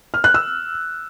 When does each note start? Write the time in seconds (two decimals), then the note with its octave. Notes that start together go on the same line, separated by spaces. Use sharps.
0.14 F6
0.24 F#6
0.34 E6